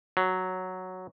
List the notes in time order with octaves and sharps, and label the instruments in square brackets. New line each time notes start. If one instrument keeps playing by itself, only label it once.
[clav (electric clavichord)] F#3